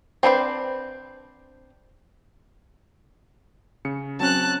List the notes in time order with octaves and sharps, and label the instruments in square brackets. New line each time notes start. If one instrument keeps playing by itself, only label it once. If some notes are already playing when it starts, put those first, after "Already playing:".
[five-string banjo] C4 D4 B4 C5
[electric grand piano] C#3 C#7
[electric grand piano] F#3 C4 C#4 [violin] A5 F#6